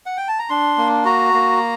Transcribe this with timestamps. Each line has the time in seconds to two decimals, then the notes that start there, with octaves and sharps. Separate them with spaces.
0.06 F#5
0.17 G5
0.28 A5
0.39 A#5
0.50 D4 C6
0.78 A#3
1.05 F#4 A#5
1.34 A#3